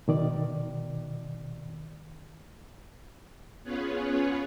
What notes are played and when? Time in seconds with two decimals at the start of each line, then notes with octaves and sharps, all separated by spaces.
0.08 B2 D#3 D5
3.64 B3 C#4 F4 G#4 B4 C#5